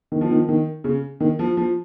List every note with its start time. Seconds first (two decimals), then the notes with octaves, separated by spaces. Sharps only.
0.12 D#3
0.21 F3
0.31 D#3
0.49 D#3
0.84 C#3
1.20 D#3
1.39 F3
1.57 F3